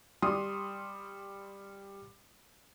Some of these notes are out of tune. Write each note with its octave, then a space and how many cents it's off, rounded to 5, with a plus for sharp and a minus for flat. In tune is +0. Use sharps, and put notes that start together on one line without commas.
G3 +10 C6 +10 D#6 +0